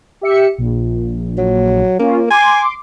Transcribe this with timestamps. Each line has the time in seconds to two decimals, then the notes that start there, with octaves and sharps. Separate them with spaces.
0.21 G4 E5 C#7
0.58 A#1
1.38 F#3
1.99 A#3 C#4 F4
2.30 G#5 C6 D6